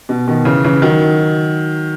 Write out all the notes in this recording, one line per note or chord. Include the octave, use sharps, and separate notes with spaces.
B2
B2 D#3
C#3 E3
C#3 E3
D#3 F#3